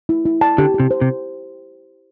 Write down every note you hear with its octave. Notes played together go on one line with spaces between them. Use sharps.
E4
E4
A5
D3 G4
G4
C3
C5
C3